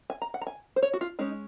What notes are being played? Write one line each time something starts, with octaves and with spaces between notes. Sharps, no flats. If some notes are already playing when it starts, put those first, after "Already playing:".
G#5
A#5
F#5
A#5
G#5
C5
C#5
F#4
F4
G#3 C#4 D#4